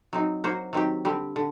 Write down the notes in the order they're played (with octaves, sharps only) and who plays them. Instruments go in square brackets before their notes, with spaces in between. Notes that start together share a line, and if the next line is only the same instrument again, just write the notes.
[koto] F#3 C4 D#4
F#3 A#3 F#4 C5
D#3 F#3 C4 G4
D3 G3 C4 G4
D3